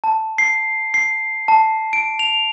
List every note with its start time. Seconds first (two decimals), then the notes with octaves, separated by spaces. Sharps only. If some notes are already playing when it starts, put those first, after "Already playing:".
0.04 A5
0.38 C7
0.94 C7
1.48 A5
1.93 D7
2.19 F7